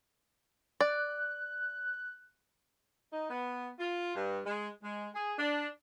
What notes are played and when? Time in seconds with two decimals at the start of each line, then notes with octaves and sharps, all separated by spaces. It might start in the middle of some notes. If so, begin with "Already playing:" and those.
0.81 D5 F#6
3.12 D#4
3.29 B3
3.80 F4
4.16 G2
4.45 G#3
4.83 G#3
5.15 G#4
5.38 D4